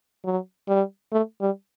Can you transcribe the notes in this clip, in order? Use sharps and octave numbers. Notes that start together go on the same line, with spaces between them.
F#3
G3
A3
G3